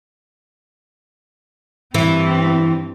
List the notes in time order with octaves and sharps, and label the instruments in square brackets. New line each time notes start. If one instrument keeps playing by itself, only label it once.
[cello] G2 C4 [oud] E3